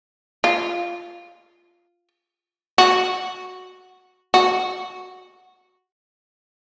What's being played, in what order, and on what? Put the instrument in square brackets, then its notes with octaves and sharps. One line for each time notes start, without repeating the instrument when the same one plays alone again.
[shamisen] F4
F#4
F#4